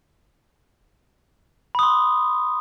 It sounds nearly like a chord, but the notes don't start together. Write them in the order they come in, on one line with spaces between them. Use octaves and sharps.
B5 D#6 C6